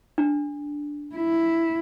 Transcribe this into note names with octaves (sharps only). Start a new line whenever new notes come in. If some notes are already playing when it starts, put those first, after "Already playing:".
D4
E4